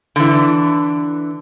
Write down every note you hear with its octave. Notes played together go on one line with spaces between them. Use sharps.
D3 E3